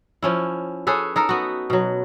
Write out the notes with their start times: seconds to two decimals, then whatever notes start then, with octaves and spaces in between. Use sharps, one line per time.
0.22 F3 C#4 E4
0.87 C#4 G#4 A4 B4
1.16 D#4 A4 A#4
1.29 B3 F#4
1.70 B2 F#3